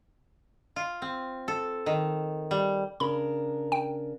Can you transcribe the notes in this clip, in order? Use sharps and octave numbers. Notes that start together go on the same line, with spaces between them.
F4
C4
A4
D#3
G3
C#3 D4 A#4 B5
G5